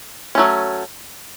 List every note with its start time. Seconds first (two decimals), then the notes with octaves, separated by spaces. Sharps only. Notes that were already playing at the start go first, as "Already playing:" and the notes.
0.35 F#3 A3 C#4